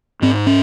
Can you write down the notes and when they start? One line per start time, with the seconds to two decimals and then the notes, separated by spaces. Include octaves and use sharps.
0.22 G#2 C4
0.47 C#4